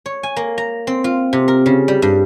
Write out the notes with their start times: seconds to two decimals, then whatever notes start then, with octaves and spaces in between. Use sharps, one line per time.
0.06 C#5
0.23 G#5
0.36 A#3
0.58 A#5
0.87 C4
1.04 F4
1.33 C3
1.48 A#4
1.66 C#3
1.88 G3
2.02 G2